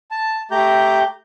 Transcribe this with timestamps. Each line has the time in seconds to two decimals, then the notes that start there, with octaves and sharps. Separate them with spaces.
0.11 A5
0.51 A3 G4 A#5 G6